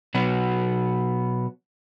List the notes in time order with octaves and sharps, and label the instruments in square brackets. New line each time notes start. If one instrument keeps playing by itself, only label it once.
[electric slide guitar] B2 F#3 B3